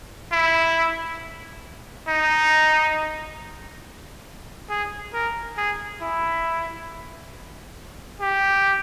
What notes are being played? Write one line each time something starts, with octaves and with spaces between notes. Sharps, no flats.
E4
D#4
G#4
A#4
G#4
E4
G4